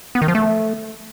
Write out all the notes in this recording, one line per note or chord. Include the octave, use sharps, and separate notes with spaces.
B3
D#3
F3
A3